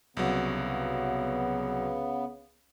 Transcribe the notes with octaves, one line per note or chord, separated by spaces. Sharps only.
C2 C#3 F#3 B3